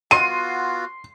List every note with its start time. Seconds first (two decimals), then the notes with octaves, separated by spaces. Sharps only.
0.11 B3 F4 F#4 C6 D#7